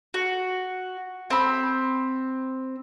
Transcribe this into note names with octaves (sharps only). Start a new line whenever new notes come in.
F#4
C4 B5